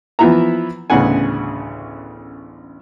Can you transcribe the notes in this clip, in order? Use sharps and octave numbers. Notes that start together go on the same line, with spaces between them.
E3 F3 B3 E4 E5 A#5
A1 D2 C#3 B3 F#5 G#5